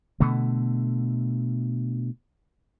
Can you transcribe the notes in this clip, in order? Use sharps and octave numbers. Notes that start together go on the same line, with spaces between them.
B2 D3 A3